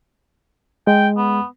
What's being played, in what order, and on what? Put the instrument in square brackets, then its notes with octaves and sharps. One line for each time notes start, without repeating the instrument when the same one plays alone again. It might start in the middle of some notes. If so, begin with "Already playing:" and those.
[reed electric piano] G#3 [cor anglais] G5
[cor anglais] B3